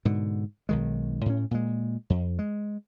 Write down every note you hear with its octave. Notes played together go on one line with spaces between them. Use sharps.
G#2 B2 D3
B1 D#3 G#3
A2 C#4
A#2 G#3
F2
G#3